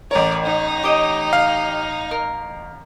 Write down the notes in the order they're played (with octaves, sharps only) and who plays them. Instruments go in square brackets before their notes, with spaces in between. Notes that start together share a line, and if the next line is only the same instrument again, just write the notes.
[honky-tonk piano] A1 C#5 [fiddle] A#4 D5
[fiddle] D#4
[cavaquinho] G4 D#5
[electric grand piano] F5
[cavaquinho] A#4